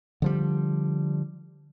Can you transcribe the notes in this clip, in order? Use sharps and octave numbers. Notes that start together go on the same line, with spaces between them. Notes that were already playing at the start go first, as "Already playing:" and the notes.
D3 F3 G3